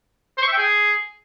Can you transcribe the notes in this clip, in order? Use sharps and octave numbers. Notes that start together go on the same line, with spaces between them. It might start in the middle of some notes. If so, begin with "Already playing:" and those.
C5
C#6
E5
G5
G#4